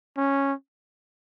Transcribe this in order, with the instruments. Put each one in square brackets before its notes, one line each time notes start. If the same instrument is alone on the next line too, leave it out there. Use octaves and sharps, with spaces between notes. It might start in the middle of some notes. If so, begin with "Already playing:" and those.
[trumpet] C#4